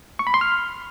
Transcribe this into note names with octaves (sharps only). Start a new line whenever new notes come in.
C#6
B5
C6
F6